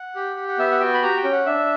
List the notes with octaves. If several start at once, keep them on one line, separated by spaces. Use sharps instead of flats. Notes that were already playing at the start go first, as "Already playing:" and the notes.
Already playing: F#5
G4
G4
F#5
B3 E5
F#5
F#4 G5
B5
G4 A#5
G5
C#4
F#5
D4 E5